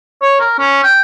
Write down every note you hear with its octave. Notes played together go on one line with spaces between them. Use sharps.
C#5
A#4
C#4
G5